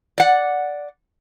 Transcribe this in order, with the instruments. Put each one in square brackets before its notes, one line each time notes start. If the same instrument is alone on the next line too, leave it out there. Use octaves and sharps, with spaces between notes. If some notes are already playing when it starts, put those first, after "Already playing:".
[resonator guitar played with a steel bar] D5 F#5